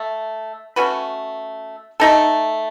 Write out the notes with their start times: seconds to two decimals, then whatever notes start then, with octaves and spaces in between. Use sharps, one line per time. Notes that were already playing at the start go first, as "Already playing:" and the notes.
Already playing: A3
0.76 A3 C#4 F#4 B4
2.00 A3 D#4 A4